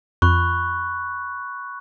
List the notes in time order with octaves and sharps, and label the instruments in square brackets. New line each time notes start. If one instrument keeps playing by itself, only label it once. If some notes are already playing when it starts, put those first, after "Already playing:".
[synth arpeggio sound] F2 [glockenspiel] B5 C#6 F#6